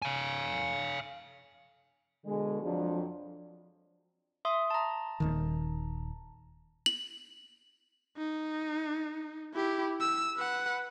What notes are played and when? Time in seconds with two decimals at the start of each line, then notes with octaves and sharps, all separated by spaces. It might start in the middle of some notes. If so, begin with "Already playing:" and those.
0.02 F5 G#5
2.25 B2 D3 G#3
2.62 F2 F3 F#3 D4
4.45 E5 C6 D#6
4.70 A5 A#5
5.20 D#1 B1 D#3
6.86 F#7
8.17 D#4
9.54 E4 G4
10.01 E6
10.37 B4 F#5